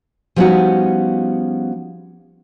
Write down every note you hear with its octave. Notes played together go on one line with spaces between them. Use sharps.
F3 G3 B3 C#4 D#4 F#4